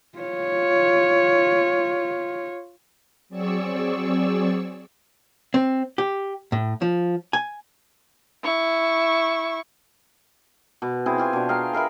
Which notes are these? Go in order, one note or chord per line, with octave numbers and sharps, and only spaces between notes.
F4 C#5
F#3 C4 G#4 D5 C#6 E6
C4
G4
A2
F3
G#5
E4 C#6
B2
C4 E4 G#4
F4 G4 G#5
B2 D4
G#4 F5 G5 A#5
G#4 A#4 E5 B5